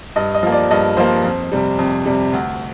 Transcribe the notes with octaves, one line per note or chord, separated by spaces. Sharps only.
G2 D#5
D#5
F3 A#3
D5
G2 D#5
F3 A#3 C5
F2
C3 G3
F2
C3 G3
D2